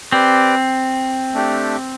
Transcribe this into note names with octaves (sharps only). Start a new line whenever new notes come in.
C4 G4 B4 D5
A3 D4 G4